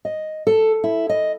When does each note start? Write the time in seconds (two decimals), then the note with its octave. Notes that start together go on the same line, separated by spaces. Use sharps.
0.05 D#5
0.47 A4
0.84 E4
1.09 D#5